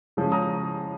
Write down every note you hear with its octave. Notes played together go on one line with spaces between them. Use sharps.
C#3 F3 G#3 C#4
A#5 D#6